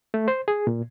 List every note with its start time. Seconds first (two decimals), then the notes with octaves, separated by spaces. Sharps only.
0.14 A3
0.28 C5
0.48 G#4
0.67 A#2